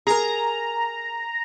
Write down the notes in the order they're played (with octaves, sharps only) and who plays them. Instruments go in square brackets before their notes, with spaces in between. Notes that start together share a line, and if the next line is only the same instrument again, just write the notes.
[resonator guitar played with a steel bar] G#4 A#4 [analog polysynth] A#5